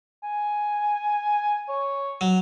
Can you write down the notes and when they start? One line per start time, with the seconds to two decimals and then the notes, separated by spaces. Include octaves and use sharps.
0.23 G#5
1.69 C#5
2.21 F#3